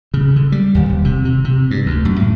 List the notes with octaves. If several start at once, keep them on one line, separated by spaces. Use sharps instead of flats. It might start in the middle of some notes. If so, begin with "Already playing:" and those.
C#3
D3
G3
D#2
D#1
C3
C3
C3
G2
D2
F#2
A2